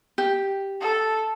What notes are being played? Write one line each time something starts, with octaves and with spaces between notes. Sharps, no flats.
G4
A4